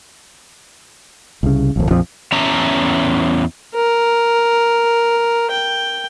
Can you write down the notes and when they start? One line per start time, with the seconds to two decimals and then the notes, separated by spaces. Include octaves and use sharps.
1.43 C2 C#3
1.76 D1 A#1
1.91 A#1 F2 F3
2.32 E2 C#4 E5 A5 A#5
3.75 A#4
5.51 G5